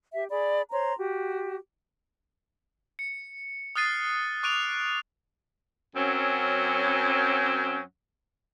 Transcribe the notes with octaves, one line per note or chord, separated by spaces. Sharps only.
G4 E5
G#4 D5 B5
C5 C#5 A#5 C6
F#4 G4
C#7
D#6 F6 F#6 A6 C7 D#7
C#6 D6 F#6 D7 D#7 F7
F#2 F#3 C4 C#4